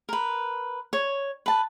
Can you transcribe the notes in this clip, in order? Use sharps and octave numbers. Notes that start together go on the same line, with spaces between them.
A#4 B4
C#5
B4 A5